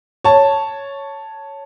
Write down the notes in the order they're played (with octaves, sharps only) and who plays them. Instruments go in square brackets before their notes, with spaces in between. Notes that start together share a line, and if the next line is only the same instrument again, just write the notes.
[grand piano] C#5 A5